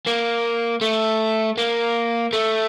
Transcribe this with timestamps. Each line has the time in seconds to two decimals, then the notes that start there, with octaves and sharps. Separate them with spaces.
0.06 A#3
0.82 A3
1.58 A#3
2.33 A3